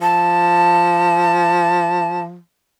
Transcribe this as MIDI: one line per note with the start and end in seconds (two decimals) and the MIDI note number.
0.01 2.38 53
0.01 2.21 81